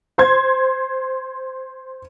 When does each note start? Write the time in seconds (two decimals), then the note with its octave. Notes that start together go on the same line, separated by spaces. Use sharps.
0.18 C5 C6 G#6